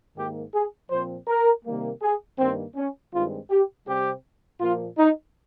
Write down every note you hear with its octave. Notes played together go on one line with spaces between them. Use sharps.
G#2 D#3 A#3 G4
G#4
A#2 F3 C4 C5
A#4
C3 D#3 G3 A#3
G#4
G2 D#3 A#3 C4
C#4
G2 D#3 G#3 C4 F4
G4
C3 G3 C4 G4
A#2 F3 A#3 F4
D#4